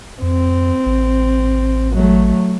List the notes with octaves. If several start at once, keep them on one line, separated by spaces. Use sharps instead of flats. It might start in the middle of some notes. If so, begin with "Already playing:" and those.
F2 C4
A1
F#3 A3